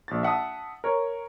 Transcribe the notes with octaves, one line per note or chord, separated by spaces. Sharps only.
A#1 A6
E5 F#5 A5 D#6
A#4 C#5